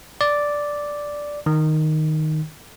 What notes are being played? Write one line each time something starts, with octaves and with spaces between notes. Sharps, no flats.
D5
D#3